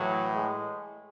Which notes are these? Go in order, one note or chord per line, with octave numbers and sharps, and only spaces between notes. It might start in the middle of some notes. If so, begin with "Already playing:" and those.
Already playing: A2 E3 F#3
G#3